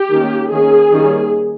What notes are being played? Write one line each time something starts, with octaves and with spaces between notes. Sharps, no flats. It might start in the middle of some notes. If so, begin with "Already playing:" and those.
Already playing: G4
D#3 A#3 C#4
D#3 A#3 C#4 G#4
D#3 G3 A#3 C#4